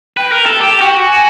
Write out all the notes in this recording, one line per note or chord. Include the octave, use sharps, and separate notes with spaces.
B4 G5
A#4
A4
G4 G5
F#4 G5
G#5